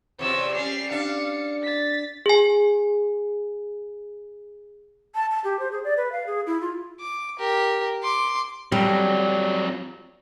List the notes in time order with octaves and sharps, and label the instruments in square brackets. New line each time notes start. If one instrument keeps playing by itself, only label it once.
[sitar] E2 C3 F3 [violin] C#5 E6
[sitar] G3 C#4 [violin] C7 F7
[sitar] D4 [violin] F5 C#7
[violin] A6 B6
[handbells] G#4 G#5
[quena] A5
A5
G4
C5
G#4
D5
B4
F5
G#4
E4
F4
[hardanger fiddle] D6
G4 A#4
C6 D6
[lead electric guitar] F2 F#3 [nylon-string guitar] G3